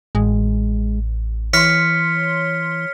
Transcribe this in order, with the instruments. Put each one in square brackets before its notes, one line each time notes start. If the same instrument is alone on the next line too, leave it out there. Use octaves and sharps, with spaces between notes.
[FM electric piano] A1 [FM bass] G#3
[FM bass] E3 [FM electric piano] C#5 C6 [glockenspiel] F6 B6 C#7